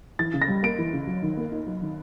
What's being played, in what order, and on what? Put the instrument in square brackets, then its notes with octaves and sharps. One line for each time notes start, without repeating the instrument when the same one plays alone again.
[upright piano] E3 [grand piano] A6
[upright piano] C#3
[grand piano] A#6
[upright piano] G3
[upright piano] A#3 [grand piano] D7
[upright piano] E3
C#3
F#3
D#3
A#3
D#4
F#3
D#3